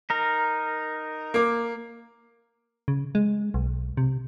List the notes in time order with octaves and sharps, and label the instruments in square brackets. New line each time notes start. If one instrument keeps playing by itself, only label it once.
[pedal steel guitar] D#4 A#4
[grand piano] A#3 D6
[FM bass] C#3
G#3
B1
C3